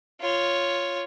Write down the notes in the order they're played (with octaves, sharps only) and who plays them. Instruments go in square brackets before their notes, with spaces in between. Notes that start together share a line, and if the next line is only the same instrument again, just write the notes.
[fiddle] F4 C#5